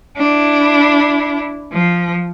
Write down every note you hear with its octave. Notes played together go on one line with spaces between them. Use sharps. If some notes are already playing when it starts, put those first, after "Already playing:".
D4 E4
F3